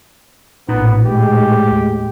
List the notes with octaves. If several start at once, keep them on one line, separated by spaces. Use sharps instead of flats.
A1 A#2 B3 D#4
A2 G#3 G4
D#2